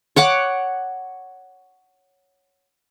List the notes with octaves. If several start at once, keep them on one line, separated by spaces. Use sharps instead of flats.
C#5 F#5 D6